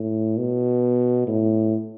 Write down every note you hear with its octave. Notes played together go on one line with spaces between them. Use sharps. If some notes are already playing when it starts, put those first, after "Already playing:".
Already playing: A2
B2
A2